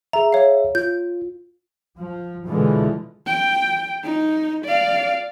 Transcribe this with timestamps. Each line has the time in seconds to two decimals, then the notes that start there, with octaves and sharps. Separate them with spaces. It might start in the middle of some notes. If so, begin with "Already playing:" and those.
0.13 G#4 E5 A#5
0.32 C#5 F5
0.75 F4 G6
1.97 F3
2.47 B2 D3 E3 F3 G#3
3.26 G5
4.04 D#4
4.65 D5 F5